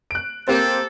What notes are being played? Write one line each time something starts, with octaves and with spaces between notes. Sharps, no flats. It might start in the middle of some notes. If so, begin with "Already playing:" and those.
F#6 D7
A#3 C4 G4 A4 C5